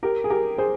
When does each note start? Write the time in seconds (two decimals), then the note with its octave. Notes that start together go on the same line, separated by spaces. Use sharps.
0.03 G4 A#4
0.24 G#4
0.30 G4 A#4
0.58 G#4 C5